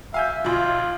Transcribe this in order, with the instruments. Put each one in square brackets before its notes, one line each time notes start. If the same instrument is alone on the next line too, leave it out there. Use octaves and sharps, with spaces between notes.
[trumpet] E5 [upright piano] F5 G#5 G6
[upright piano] B1 F3 [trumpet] F4